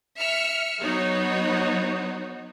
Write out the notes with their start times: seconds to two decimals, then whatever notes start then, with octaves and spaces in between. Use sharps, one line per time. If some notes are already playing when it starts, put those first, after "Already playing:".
0.18 E5 F6 C#7
0.80 F#3 B3 D#4 F#4 C#5